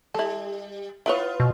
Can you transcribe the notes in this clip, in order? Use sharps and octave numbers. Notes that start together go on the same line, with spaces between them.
G3 E4 A4
B3 E4 F4 B4 C#5
B2